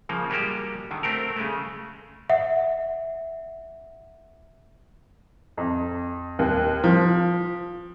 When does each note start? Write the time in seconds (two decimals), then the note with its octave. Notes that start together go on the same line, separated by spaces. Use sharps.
0.09 C#3 F3 A#3
0.30 G3 G#3 A#3 F#4 G4
0.91 D3 D#3
1.03 A3 C4 G4 A#4
1.36 C#3 G#3 A3
2.30 E5 F#5
5.57 F2
6.39 D#2
6.84 F3